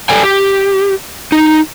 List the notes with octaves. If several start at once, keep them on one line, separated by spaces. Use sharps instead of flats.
G4 A4 D5 G5 G#5
G4
D#4